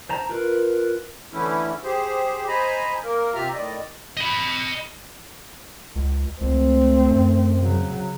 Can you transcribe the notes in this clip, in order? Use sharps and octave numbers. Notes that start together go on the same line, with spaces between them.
C5 A5 A#5
F4 A#4 B4
D3 E3 A3 C#4 E4
G4 G#4 C5
C5 D#5 G#5 A#5 B5
A#3 A#4
C3 F4 G4 E5 A#5 F6
A2 D#3 D5 D#5
D#5 B5
C#2
C#2 A3 C4
F#2
C#3 F#3